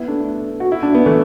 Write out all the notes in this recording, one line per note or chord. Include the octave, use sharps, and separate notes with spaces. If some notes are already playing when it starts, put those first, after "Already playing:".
Already playing: B3 E4
A3 D4
F#4
E4
D4
B3
E3 A3